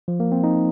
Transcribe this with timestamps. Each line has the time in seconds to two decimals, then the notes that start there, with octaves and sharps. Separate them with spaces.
0.08 F3
0.20 A#3
0.32 C4
0.43 D#4